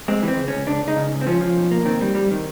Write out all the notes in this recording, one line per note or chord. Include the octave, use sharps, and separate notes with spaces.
G#3 C4
E3 C4
C#2
C#2 C#4
C#2 D4
C#2
D#4
C#3
C#2
C4
F3 C#4
F3
B1
A#3
D#3 C4
G3
G3
D#3